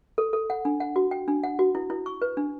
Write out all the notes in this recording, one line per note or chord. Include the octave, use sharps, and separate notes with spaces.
A4
A4
F#5
D4
F#5
F#4
G5
D4
F#5
F#4
E4
E4
C#6
B4
D4